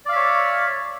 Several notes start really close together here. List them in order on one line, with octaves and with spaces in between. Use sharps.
D5 F5 E5 C#5